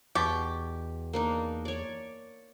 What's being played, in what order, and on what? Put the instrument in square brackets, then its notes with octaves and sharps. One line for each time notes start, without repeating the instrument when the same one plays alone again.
[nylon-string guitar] E2 [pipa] B2 G4 C#6
[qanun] A#3 D4 D#4
C#5 D5